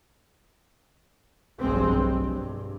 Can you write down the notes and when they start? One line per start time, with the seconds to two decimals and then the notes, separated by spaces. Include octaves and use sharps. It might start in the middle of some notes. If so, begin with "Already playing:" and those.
1.60 F1 B1 G2 G#3 C4
1.97 G2